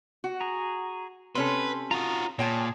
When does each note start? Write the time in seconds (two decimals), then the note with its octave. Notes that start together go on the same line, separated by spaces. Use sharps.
0.24 F#4
0.41 G#4 A#5
1.35 C3 C#4 A4 B4 C6
1.91 F4 F#4 A#5 D#6
2.39 A#2 G#4 C#5 G5 A5